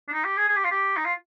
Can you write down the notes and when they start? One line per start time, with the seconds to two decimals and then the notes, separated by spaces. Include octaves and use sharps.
0.08 D4
0.13 D#4
0.25 G4
0.37 G#4
0.48 G#4
0.56 G4
0.64 F4
0.71 G4
0.97 D#4
1.05 F4